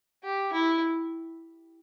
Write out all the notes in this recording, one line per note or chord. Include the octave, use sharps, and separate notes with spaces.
G4
E4